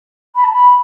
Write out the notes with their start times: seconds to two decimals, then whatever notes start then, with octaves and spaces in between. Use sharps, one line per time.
0.34 B5
0.43 A5
0.52 B5